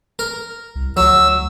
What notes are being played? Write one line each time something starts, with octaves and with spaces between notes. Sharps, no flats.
A#4
C2
D2 F#3 E6